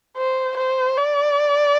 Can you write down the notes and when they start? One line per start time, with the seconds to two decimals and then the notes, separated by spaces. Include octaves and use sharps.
0.17 C5
0.56 C5
0.97 D5